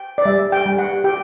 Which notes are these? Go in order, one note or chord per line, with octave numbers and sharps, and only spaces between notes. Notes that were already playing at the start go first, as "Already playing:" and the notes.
Already playing: G5
D5
G3 E5
G5
G3
F#5
G4 G5